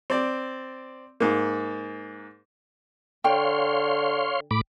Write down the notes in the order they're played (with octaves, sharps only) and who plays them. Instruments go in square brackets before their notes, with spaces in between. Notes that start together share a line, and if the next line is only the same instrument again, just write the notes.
[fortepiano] C4 D5
G#2 A#3
[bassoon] D3 [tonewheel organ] C#5 F5 C6 [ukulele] G5
[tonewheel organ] A2 B5 D6